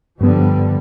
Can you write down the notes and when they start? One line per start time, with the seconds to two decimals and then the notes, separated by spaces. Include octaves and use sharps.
0.21 G2 D3 F3 G3 B3